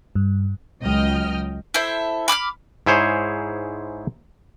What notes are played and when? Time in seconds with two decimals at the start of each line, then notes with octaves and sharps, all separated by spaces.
0.15 G2
0.82 C#2 F#3 D#5 G5 F6
1.74 E4 A4 C5 E5
2.28 B5 D6 E6 F6
2.86 G#2 E4 G#4 C5 C#5